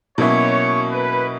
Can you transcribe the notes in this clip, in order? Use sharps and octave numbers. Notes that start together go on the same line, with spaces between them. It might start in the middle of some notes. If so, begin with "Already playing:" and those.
B2 F#3 A#3 C#4 E4 C#5
B4